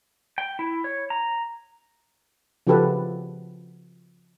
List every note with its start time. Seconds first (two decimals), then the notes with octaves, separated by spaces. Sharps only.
0.38 G5
0.59 E4
0.84 C#5
1.10 A#5
2.67 C#3 F3 F#4 G4 A4 B4